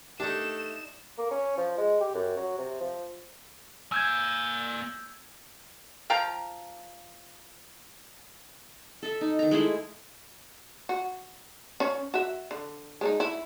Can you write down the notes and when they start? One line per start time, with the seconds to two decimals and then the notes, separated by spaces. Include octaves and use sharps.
0.20 A3 D4 D#4 G4 E7
1.18 A#3
1.31 C#4
1.58 F3
1.77 G#3
2.01 G4
2.14 F#2
2.37 F#3
2.58 C3
2.80 F3
3.92 A#3 G#5 E6 G6 G#6
6.10 F3 F5 G5 A#5
9.03 A4 E5
9.21 D#4
9.39 D#3 A#5
9.51 G#3 A3 E4 C5
10.89 F#4
11.80 C#4 C#5
12.14 F#4 E5
12.51 D3
13.01 G#3 D4 D#4
13.20 E4